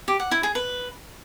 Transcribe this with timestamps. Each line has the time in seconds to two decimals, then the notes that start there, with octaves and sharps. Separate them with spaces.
0.08 G4
0.20 F#5
0.31 E4
0.43 G#4
0.55 B4